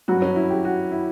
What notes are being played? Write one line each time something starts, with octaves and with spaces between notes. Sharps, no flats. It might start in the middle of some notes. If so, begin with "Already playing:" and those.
G2 F#3 F#4
C#4
E4
G4
F#4
E4